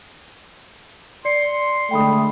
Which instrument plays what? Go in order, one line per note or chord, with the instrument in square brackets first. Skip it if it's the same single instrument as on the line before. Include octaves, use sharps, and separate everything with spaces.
[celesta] D5 C#7 [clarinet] C6
[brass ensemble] D3 G#3 A3 [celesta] G5 B5 D#6